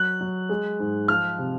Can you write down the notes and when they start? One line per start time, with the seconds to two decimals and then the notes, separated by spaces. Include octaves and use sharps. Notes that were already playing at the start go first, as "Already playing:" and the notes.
Already playing: F#3 F#6
0.21 F#3
0.49 G#3
0.80 G#2
1.08 F3 F6
1.38 C3